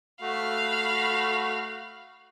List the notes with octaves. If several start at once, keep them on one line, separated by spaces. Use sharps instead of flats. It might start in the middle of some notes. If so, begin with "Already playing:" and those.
A3 F#4 F5 B5